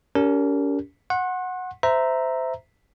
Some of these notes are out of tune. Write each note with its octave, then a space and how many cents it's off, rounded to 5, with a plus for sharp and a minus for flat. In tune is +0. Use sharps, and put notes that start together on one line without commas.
C#4 +45 G4 +0 A#4 -15
F#5 -10 C6 +40
C5 -20 E5 +0 A#5 +0